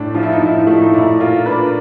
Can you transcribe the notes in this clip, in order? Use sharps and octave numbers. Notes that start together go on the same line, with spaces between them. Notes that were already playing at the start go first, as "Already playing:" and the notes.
Already playing: A2 A3 D4
F3 F4
E4
D#4
A2 E4
A3
D#4
A#2 E4
A#3 F4
D4 B4